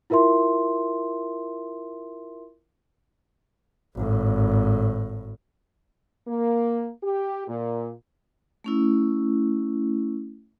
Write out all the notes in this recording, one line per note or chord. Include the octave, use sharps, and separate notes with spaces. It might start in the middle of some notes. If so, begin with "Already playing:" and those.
E4 F4 A#4 E5 C6
G#1 A2
A#3
G4
A#2
A3 C#4 E4